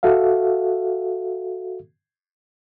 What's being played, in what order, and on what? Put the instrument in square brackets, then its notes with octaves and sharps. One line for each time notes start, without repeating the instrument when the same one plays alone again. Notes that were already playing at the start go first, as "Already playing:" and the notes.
[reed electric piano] F#4 A4 E5 F5